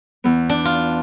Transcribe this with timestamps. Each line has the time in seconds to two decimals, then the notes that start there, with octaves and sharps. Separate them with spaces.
0.24 E2 B3
0.50 D4
0.65 F4